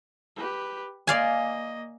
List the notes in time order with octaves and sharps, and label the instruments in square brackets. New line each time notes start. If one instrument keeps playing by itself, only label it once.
[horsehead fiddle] G4 B4
[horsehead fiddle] A#3 D#5 [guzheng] D5 F5 G#5